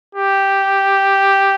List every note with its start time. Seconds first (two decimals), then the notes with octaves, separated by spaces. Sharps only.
0.15 G4